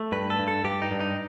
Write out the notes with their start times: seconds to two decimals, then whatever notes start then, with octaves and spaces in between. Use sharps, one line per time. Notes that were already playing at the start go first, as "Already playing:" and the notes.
Already playing: A3
0.12 G2 B4
0.30 A4
0.39 G2
0.48 A4
0.64 G2 G4
0.82 D#4
0.91 G2
1.00 D#4